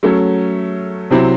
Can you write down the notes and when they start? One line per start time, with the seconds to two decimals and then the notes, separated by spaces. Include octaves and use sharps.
0.03 F#3 A3 C#4
1.11 C3 F#3 C4 E4